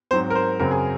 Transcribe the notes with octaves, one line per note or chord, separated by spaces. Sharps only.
G#2 F#3 C4 C5
A#4
C5
F#2 C#3 F#3 C4 A#4
G#4